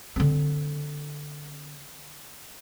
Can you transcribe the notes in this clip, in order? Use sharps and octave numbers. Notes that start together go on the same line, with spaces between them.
D3 C4